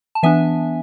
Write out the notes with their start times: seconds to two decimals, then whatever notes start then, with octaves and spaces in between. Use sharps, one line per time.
0.15 A5
0.23 E3 B3 D4 E5 G#5